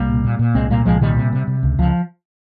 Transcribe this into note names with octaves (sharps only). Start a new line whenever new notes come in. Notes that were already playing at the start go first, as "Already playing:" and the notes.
Already playing: C2 G3 A#3
A#2
A#2
A#2
C2 G#3 C4
A#2 G3 A#3
C2 F3 G#3
A#2 D#3 G3
C3
C3
C3
C#2
C#2 F3